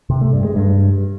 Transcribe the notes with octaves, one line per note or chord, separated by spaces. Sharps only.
C3
A3
G2
G#3
G2